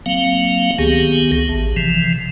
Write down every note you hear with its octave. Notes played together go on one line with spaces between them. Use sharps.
F#3 A#3 C4 F5
C#2 D#3 B3 G4 G#4
A1
C3 E3 F3